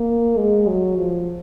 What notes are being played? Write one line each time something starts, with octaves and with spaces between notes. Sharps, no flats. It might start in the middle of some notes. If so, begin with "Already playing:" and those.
Already playing: A#3
G#3
F#3
F3